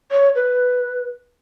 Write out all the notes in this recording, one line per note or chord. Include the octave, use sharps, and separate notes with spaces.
C#5
B4